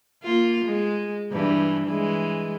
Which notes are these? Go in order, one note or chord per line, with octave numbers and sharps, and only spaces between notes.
A#3 F4
G#3
G2 E3
E3 G#3